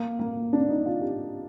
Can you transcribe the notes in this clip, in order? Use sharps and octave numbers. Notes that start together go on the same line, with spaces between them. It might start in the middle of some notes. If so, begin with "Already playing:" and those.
Already playing: A#3
A#3
D4
D#4
F4
G4